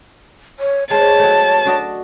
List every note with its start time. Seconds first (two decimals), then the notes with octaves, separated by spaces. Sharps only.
0.60 C#5
0.90 G#3 C5 C#5 A5
1.19 F#3 A3
1.65 D4 F#4 D#5